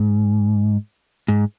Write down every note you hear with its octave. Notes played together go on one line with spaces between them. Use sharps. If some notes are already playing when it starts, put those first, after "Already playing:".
Already playing: G#2
G#2